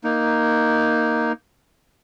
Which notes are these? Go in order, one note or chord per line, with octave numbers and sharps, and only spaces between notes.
A#3 D#4